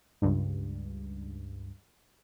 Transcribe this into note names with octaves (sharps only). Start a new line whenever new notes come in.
C#2 G2